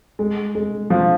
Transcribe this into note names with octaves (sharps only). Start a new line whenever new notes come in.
G#3
G#3
F3